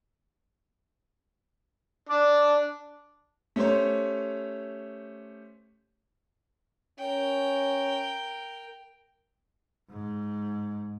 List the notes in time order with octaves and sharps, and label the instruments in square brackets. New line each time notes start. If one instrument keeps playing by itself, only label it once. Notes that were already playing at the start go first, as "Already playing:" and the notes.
[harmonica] D4 D5
[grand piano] A3 C#4 G4 C5 C#5
[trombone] C#4 [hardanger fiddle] A#4 G5
[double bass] G#2